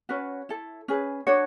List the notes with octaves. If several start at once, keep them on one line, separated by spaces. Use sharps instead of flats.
C#4 F#4 B4 C#5
E4 A4
C#4 G#4 B4
D4 F#4 A4 C#5